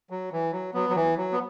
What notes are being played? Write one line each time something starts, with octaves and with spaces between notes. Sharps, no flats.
F#3
E3
F#3
F#3 B3
F#3
E3
F#3
B3